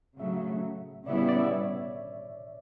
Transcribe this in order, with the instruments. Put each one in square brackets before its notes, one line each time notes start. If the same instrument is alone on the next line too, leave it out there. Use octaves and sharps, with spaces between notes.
[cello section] C#3 F#3 A3 [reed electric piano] E5
[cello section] C#3 G3 B3 E4 [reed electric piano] D5
[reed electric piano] D5
D5
E5
C#5